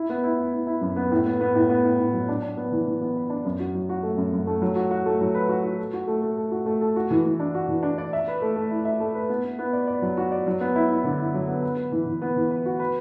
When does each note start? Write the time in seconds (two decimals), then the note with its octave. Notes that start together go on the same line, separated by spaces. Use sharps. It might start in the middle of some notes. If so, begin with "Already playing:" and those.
Already playing: E4
0.10 B3
0.24 E4
0.39 B3
0.53 E4
0.67 E4
0.81 F#2
0.96 B3
1.11 A2
1.25 B3
1.41 B3
1.55 A2
1.69 B3
1.84 A2
1.99 A2
2.13 F#3
2.28 D4
2.42 D4
2.57 B3
2.72 E3
2.86 E3
3.01 B3
3.16 B4
3.30 D4
3.45 F#2
3.60 F#4
3.74 F#3
3.89 F#4
4.03 A3
4.17 F#2
4.33 F#2
4.47 A3
4.62 F#3
4.76 F#4
4.91 F#4
5.06 A3
5.21 F#3
5.34 B4
5.49 F#4
5.64 F#4
5.78 A4
5.93 F#4
6.07 A3
6.22 A3
6.37 A4
6.51 F#4
6.66 A3
6.81 A4
6.96 F#4
7.11 E3
7.25 E3
7.39 D4
7.55 F#4
7.68 E3
7.83 D4
7.98 D5
8.13 E5
8.28 B4
8.42 A3
8.56 A3
8.71 E4
8.85 E5
9.00 A3
9.14 B4
9.29 B3
9.44 B3
9.59 B3
9.73 D5
9.87 D5
10.02 F#3
10.17 F#4
10.31 D5
10.47 F#3
10.60 B3
10.76 E4
10.90 E4
11.04 D3
11.19 E4
11.34 F#3
11.48 B3
11.62 B4
11.77 B4
11.92 E3
12.06 E3
12.22 B3
12.36 E3
12.51 B4
12.66 F#4
12.79 B4